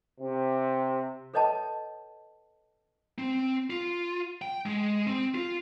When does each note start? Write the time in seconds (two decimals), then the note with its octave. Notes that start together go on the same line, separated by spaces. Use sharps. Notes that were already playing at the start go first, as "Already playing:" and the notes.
0.20 C3
1.34 A4 B4 C#5 D#5 G5 A5
3.18 C4
3.70 F4
4.42 G5
4.66 G#3
5.07 C4
5.35 F4